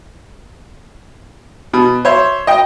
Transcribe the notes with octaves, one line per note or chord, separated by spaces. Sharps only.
B2
C5 C#5 E5
D#5 G5